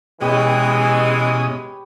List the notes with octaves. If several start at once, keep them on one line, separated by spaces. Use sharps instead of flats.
B2 E3 G#3 C#4 G4 B4 C#5 D#6